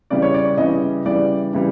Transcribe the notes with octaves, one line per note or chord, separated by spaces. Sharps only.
C#3 E3 G3 D5
C#5
D5
C#3 E3 G3 D#5
C#3 E3 G3 D5
C#3 E3 G3